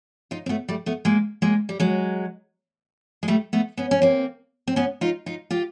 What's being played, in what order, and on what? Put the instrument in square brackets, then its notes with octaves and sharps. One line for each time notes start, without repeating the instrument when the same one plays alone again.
[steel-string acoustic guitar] D#4 F4
C4
A3 B3
G3 A3
A3 B3
G#3 A#3
G#3 A#3
G3
F#3 G#3
G#3
G3 A3
A3 B3
B3 C#4
C#4
A#3 C4
C4
B3 C#4
D#4 F4
D#4 F4
F4 G4